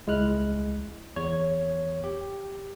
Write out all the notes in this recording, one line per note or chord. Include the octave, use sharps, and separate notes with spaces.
C#2 G#3 E4 F6 F#6
E2 C#5
G4